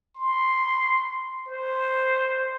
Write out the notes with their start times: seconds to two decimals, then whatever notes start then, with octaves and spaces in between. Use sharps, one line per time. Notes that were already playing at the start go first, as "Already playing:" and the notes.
0.16 C6
1.48 C5